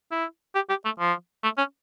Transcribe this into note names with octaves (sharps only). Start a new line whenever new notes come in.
E4
G4
G4
A3
F3
A3
C#4